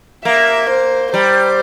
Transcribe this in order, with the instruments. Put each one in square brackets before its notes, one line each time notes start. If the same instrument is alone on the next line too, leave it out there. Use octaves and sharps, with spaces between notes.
[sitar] A#3 [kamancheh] E5
[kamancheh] C5
[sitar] G3 [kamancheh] C5